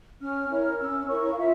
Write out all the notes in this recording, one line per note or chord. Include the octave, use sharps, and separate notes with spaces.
C#4 F6
E4 A#4 C#5
C#4 E6
E4 A#4 C#5 C#6
F5
F4 E5